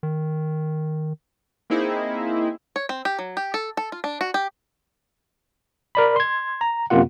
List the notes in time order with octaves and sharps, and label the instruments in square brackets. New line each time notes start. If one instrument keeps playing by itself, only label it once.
[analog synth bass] D#3
[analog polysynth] A#3 C4 D#4 E4 G#4
[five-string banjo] C#5
C4
G4
F#3
G4
A4
A4
F4
D4
F#4
G4
[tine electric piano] A#4 D5 B5
C6 G#6
A#5
F#2 C3 A#3 F4 F#5